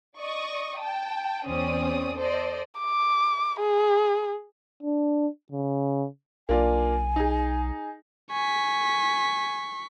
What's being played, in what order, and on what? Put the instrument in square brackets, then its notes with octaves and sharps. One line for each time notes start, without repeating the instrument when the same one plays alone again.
[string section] D5 D#5 C#6 D#6
G5 A5
E2 C4 C#4 D5 D#6
A4 C5 D5 D#5
[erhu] D6
G#4
[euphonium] D4
C#3
[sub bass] B1 [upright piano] A#3 D4 F4 [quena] G#5
[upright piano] D#4 G#4
[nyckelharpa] G#5 [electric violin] C#6 B6